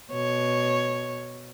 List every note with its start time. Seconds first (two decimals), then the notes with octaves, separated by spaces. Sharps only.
0.12 B2 C#5